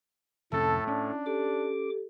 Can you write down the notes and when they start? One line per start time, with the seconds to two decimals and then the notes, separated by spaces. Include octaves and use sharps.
0.52 F2 A2 C3 A3 C#4 A4
0.87 C#4 D4
1.26 G4 A4 D6